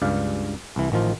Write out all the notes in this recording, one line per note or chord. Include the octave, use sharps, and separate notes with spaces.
C#2 G2 D5 F5
C2 E3
A1 D#3 F3 F4